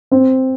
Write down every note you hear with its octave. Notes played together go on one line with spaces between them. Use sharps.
C4